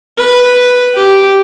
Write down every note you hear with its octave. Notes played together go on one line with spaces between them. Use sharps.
B4
G4